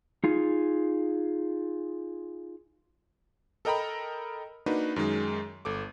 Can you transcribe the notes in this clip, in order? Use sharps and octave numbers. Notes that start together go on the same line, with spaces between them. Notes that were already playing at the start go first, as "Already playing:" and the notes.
D#4 F4 G#4
A4 A#4 D#5 G5 A#5 B5
A#3 D4 D#4 F#4 B4
F#2 D#3 G#3
G1 A4 D6